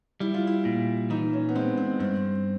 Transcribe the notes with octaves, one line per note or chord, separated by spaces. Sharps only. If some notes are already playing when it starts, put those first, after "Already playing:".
G3 E4
F4
E4
A#2
E3 D#4
C#4
B3
G#3 C4
C4
G2 C4